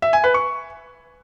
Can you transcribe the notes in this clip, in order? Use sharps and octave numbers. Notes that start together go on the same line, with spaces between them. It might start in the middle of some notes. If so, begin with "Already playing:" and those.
E5
G#5
B4
C#6